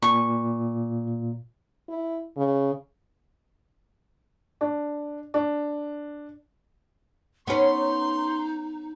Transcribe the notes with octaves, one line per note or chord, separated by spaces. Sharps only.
A#2 C#6
E4
C#3
D4
D4
B3 C#4 D#4 C6